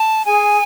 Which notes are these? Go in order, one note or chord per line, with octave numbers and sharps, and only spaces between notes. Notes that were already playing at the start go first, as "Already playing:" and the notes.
Already playing: A5
G#4 G#5